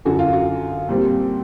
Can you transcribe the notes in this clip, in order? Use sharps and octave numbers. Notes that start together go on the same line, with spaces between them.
F#2 D3 F#3 F#4
F4
F#4
A#2 G3 C4